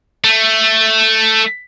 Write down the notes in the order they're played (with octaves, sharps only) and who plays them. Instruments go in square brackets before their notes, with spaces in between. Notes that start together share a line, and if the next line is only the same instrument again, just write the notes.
[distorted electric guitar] A3